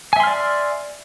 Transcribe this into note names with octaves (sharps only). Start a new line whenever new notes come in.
D5 E5 G#5 C6 F6